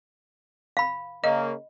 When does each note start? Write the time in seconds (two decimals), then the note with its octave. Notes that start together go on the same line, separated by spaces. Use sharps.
0.77 F5 B5
1.24 C#3 A#3 D#5